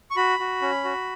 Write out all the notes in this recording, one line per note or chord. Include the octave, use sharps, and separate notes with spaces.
C#6
F#4 B5
F#4
C#4
F#4